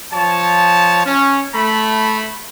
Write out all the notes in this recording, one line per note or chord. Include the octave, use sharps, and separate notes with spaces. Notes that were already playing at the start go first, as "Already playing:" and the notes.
F3 C#5 A5
C#4
A3 B5